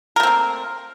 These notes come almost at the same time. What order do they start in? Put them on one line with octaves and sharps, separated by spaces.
A#4 A3 C4 A#3